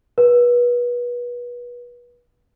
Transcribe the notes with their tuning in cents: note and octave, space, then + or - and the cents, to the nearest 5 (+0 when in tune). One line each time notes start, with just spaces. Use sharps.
B4 -30